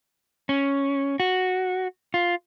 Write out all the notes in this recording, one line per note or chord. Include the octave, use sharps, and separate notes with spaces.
C#4
F#4
F4